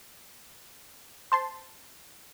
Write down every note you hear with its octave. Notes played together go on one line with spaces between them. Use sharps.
C5 A5 C6